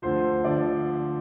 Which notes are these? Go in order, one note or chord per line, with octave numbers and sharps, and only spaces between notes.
D2 D3 F3 C5
D3 F3 D5